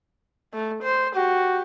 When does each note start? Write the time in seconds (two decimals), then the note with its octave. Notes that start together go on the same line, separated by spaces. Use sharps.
0.54 A3
0.83 C5
1.15 F#4 G4